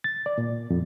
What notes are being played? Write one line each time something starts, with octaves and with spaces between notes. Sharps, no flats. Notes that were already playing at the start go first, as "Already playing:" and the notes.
A6
D5
A#2
F2